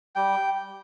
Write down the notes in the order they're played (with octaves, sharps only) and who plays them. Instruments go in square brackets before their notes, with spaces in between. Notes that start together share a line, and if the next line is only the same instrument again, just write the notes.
[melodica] G3 G5